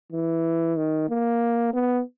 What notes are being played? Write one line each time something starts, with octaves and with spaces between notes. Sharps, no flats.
E3
D#3
A#3
B3